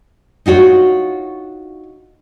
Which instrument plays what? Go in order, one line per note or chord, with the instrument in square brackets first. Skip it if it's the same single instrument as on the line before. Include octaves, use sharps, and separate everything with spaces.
[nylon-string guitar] D#4 F4 F#4 C#5